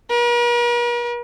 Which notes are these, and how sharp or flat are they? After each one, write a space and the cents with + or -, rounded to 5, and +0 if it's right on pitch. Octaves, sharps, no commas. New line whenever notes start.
A#4 +45